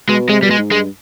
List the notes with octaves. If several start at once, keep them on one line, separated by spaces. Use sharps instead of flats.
B2 G#3
C3 G#3
B2 G3
G#3
G#2
G2 G#3